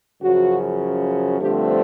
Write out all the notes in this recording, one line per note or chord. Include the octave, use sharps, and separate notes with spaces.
F#2 C#3 F3 F#4
G2 D3 F3 A3 C4 G4